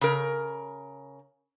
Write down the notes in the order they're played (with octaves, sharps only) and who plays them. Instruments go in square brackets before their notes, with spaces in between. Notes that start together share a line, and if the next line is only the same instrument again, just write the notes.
[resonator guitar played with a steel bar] C#3 A#4